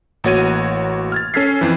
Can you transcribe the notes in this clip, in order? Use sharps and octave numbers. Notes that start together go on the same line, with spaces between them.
A1 A#3 F#4 C#5 G#6 D#7
F6 G#6 A6
C#4 A4 F6 G#6 B6 C7
F2 E3